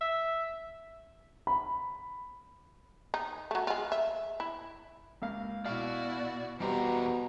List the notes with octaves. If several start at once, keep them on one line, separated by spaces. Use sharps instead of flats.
E5
B5
D#4
F#3 A3
G#3 F4
E5
E4
C#2 A#3 F5
B2 E4 F#4 D5 F5
E2 B2 G3 G4 C5 A#5